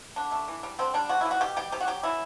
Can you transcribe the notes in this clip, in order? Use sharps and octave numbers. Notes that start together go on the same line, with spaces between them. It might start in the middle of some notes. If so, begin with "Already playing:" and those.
D3 D4
A3
E3
G3
D3 C4
G3 D4
C3 F#4
E4
E3
F#4
B2 G4
G3 G4
C3 G4
F#4
F#3 G4
E3 E4